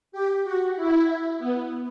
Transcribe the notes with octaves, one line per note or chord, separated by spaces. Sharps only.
G4
F#4
E4
B3